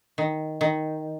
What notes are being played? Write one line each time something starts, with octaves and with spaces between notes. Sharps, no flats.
D#3
D#3